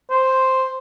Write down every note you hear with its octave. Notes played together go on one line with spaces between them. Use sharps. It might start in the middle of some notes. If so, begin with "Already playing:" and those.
C5